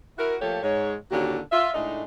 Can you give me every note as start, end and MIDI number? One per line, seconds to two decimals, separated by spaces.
0.19 0.35 64
0.19 0.35 66
0.19 0.35 70
0.41 0.60 53
0.41 0.60 57
0.41 0.60 58
0.41 0.60 67
0.41 0.60 69
0.41 0.60 73
0.62 0.95 44
0.62 0.95 56
0.62 0.95 73
1.12 1.39 39
1.12 1.39 46
1.12 1.39 50
1.12 1.39 61
1.12 1.39 66
1.12 1.39 67
1.52 1.70 65
1.52 1.70 76
1.74 2.03 45
1.74 2.03 56
1.74 2.03 57
1.74 2.03 62
1.74 2.03 63